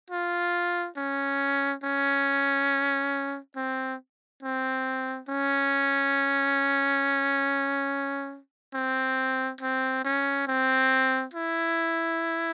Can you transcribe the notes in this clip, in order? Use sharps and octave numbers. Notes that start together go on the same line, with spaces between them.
F4
C#4
C#4
C4
C4
C#4
C4
C4
C#4
C4
E4